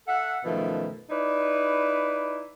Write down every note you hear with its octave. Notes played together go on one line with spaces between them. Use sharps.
A4 E5 F#5
F#2 B2 D#3 F3 A3
D#4 E4 B4 D5